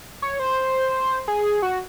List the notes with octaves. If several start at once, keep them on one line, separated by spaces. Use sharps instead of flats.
C#5
C5
G#4
F#4